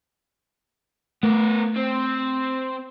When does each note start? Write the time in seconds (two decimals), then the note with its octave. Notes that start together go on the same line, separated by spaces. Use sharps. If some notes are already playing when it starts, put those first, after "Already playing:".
1.23 A3 B3 A#4
1.76 C4